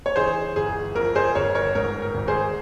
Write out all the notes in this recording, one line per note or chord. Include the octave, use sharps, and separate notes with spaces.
C#5
E3 G#4 C5
G1 G#4
F2 A#4
G#4 C5
G1 A#4 C#5
A#4 C#5
G#2 A#4
A#4
G#1
G#4 C5